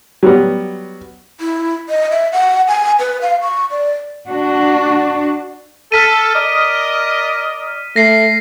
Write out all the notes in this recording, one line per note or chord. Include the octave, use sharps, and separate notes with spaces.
F#3 G3 B3
E4
D#5
E5
F#5
G#5
B4
F5
C#6
D5
D4 F#4
A4 F6 B6 D#7
A#4 D5 D#5
A3 A#6 C7